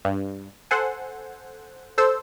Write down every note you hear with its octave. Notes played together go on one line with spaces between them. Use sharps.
G2
A4 C5 F#5 G#5
A4 C5 E6